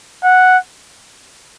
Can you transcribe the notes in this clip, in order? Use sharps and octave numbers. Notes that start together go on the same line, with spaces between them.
F#5